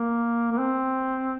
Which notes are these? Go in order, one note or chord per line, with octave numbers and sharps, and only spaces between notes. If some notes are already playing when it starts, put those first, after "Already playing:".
Already playing: A#3
A#3
C4